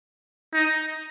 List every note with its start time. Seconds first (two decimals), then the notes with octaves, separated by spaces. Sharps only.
0.54 D#4